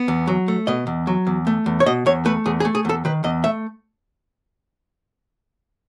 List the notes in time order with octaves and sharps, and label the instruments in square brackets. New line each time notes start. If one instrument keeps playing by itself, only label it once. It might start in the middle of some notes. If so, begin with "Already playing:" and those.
Already playing: [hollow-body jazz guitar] B3
E2
F#3
A3
B2 D#5
E2
F#3
E2
A3
E2
C#5
B2 D#5
E2 C#5
A3 B4
E2 G#4
G#4
A3
G#4
E2 A4
D#3 B4
E2 D#5
A3 E5